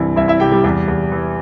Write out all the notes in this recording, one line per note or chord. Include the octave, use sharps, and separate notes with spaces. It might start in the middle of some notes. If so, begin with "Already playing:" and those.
Already playing: C2 G2 E3 E4
C2 E4 E5
E4 E5
C3 G4 G5
G3 G4
E2 G3 G4
E2
E3